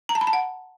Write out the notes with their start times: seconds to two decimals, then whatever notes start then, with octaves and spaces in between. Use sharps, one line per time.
0.09 A#5
0.15 A5
0.21 B5
0.27 A5
0.33 F#5